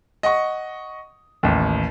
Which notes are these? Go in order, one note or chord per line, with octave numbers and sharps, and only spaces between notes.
D#5 F#5 C#6
A1 D#2